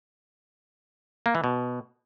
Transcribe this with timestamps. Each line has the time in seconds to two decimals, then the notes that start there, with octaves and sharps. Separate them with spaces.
1.26 A#3
1.35 E3
1.44 B2